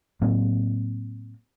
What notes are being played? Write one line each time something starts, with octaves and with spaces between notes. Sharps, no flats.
A2 F#3 A#3 C4